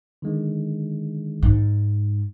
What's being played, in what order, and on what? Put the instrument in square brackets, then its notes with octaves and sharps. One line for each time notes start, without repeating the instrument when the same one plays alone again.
[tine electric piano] D3 D#3 G#3
[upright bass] G#2